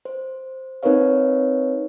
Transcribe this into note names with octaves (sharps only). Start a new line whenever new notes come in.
C5
C4 D#4 A#4 B4 C#5 F5